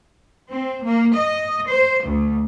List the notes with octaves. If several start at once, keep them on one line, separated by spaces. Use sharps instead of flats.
C4
A#3
D#5
C5
D2